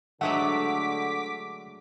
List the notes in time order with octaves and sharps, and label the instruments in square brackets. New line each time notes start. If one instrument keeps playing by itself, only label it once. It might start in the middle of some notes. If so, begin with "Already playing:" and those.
[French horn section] D3 [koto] F#3 G#3 A3 [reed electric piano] F#5 [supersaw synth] D6 B6